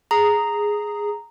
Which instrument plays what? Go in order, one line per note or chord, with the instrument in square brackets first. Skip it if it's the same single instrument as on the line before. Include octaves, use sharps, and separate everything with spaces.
[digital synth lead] G#4 [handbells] A#5